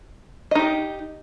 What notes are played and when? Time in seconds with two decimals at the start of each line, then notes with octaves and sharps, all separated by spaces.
0.51 D#5
0.55 D#4
0.59 G4